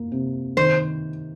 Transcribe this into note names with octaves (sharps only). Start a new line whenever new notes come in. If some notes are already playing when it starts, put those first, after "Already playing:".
Already playing: A#3
C3
D#3 C5